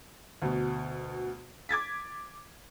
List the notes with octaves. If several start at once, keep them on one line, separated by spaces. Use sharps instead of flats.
D2 B2
D6 G#6 A6 B6